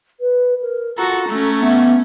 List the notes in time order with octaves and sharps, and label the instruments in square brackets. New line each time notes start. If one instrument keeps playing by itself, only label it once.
[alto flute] B4
A#4
[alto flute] F4 [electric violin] F#4 A4 [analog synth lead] A#5
[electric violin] A3 C#4 [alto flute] A4
[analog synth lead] B3 [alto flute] E5